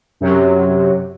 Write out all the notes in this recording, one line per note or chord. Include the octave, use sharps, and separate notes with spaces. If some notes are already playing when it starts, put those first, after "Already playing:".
F#2 C3 F#3